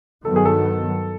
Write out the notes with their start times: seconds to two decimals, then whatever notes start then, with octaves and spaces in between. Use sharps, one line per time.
0.25 G2 D#3 F#3 B3 A4
0.36 G#4
0.45 A4